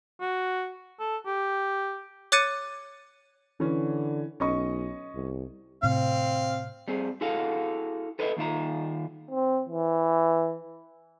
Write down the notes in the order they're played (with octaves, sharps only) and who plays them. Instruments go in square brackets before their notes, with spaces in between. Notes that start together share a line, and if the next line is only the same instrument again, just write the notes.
[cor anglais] F#4
A4
G4
[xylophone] C#5 D6 F#6 A6 C#7 D#7
[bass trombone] D3 [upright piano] E3 C#4
[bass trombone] B1 [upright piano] C#4 D#5 C#6
[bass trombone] C2
[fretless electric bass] A2 C3 [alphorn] C4 [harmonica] F5
[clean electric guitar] G3 C4 G#4
E4 F#4 G#4 A4 F5
A4 B4 C#5 D#5 E5
D#2 D#3 F4 E5 A#5
[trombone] C4
E3